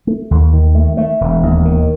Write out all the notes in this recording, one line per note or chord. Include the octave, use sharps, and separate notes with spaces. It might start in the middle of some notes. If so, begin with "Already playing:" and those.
A3
D#2
D#3
A3
A3
E1
D#2
D#3